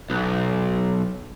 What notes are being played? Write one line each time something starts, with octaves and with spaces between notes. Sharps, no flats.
B1